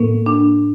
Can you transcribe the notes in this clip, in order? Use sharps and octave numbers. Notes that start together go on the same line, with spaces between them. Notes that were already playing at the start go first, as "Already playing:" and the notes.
Already playing: A2 A#3
D4